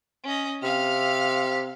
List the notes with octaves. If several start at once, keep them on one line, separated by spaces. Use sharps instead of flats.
C#4 D#5
C3 F5 F6